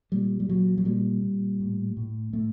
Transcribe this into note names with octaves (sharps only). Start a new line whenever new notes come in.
A#2 G3
G3
A#2 F#3
F#3
A#2 G3
A#2
A2
A2
A2 A3